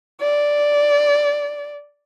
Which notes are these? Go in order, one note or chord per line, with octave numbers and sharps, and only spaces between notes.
D5